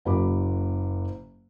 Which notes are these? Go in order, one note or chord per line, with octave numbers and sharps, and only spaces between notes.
F#1 A#3 F#4 B5 D6